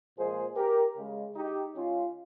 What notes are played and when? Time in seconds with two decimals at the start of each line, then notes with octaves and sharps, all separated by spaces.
0.17 A#2 F3 G#3 G#4 C5
0.57 G4 A#4
0.97 C#3 G#3
1.35 D#4 G4
1.75 C#3 G#3 C#4 F4